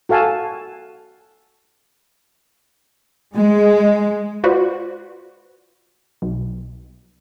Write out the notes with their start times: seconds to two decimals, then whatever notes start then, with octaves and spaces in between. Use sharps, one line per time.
0.09 F#4 A4 F5 G#5 A5
3.34 G#3
4.44 F4 F#4 B4 C5 D5
6.22 B1